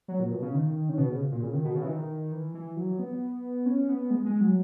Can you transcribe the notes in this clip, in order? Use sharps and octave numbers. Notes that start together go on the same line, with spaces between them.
F#3
A#2
B2
C#3
D#3
C#3
B2
C#3
A#2
C#3
D#3
B2
C#3
E3
D#3
E3
E3
F#3
B3
C#4
B3
G#3
G#3
F#3